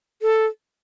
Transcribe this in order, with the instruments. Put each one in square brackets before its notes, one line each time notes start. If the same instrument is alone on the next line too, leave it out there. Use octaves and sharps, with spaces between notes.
[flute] A4